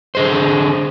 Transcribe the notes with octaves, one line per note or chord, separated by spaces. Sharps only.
D3 G#4 C5